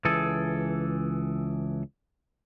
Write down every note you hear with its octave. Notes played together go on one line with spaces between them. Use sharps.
C#2 E3 G#4 A4